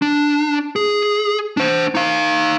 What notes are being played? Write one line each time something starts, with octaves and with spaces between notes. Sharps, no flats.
D4
G#4
D4 C5
D#4 F5